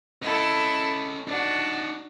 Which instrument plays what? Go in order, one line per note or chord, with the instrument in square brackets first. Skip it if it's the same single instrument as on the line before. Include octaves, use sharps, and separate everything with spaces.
[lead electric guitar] C#4 D#5 [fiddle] E4 A4
[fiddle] D4 F#4 [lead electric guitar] D#4 D5